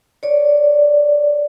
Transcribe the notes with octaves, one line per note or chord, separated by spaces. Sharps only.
C#5 D5